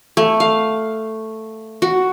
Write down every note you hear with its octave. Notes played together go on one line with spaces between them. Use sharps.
A3
F5
F#4